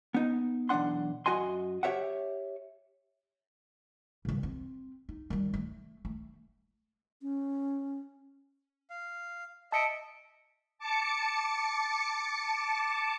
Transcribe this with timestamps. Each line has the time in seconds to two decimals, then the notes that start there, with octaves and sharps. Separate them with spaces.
0.14 B3 D#4
0.69 B1 E2 A3 D4 F#5 C6
1.26 F#2 F#4 D#5 G#5 C6
1.83 G4 C#5 E5 F#5
4.25 G2 C#3
4.43 C4
5.09 D#4
5.30 D#3 G3
5.54 A3
6.05 A3
7.22 C#4
8.90 F5
9.72 D#5 E5 A5 C#7 D7
10.78 A5 D6 C#7